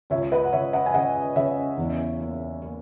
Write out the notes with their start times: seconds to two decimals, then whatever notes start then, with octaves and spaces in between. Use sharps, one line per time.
0.10 C#2 C#5 E5
0.32 B4 D#5
0.44 F#5
0.52 C#2 C#5 E5
0.73 D#5 F#5
0.86 G#5
0.94 C#3 D#5 F#5
1.35 C#3 C#5 E5
1.77 E2
2.20 A#3
2.62 A#3